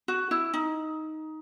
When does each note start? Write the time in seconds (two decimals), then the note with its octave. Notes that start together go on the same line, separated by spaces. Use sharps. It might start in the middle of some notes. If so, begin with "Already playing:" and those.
0.08 F#4
0.31 E4
0.54 D#4